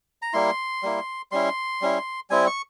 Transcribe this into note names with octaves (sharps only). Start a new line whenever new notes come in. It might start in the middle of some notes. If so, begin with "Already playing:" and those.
A#5
G3 A#3 E4 C6
G3 A#3 E4
G3 C#4 E4 C6
G3 C#4 E4
G3 C4 E4 G#5
C#6